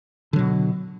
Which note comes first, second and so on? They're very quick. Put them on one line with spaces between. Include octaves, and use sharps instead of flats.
D3 F#3 B2